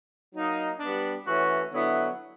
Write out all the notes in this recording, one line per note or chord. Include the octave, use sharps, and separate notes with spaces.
F#3 A#3 D#4
G3 B3 D4
E3 A3 C#4 F#4
D3 F#3 B3 E4